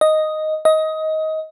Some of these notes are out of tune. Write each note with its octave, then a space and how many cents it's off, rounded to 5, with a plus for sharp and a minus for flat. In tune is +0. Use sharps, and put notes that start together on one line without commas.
D#5 +0
D#5 +20